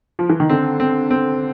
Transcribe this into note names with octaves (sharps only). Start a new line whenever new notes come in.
F3
E3
D#3
D3 C4
C4
C4